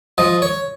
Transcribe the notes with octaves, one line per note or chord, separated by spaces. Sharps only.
F3 D#5
C#5